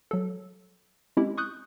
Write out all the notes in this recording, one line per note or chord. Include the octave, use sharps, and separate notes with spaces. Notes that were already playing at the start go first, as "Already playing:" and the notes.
F#3 A4
G#3 C4 C#4 E4 G4
C#6 D#6 F#6 G6